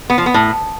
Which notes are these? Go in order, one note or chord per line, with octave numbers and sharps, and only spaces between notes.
B3
F3
B3
A2